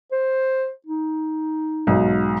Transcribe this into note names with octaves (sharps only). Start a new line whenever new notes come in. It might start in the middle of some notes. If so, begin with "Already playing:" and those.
C5
D#4
B1 G#2